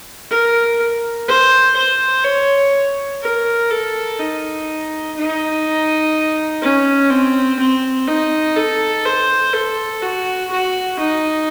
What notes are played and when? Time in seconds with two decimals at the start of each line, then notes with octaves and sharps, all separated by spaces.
0.30 A#4
1.28 C5
1.76 C5
2.25 C#5
3.22 A#4
3.71 A4
4.19 D#4
5.16 D#4
6.62 C#4
7.10 C4
7.59 C4
8.08 D#4
8.56 A4
9.05 C5
9.53 A4
10.02 F#4
10.51 F#4
10.99 D#4